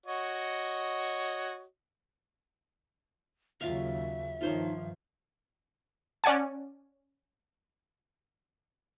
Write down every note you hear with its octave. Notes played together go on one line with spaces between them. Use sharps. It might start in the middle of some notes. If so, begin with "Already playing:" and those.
F#4 C#5 D#5
D#2 C#3 F#3 F4 E5 F5
G2 D#3 F3 D#4 F4 C5 C#5
C#4 D5 F#5 G#5 A5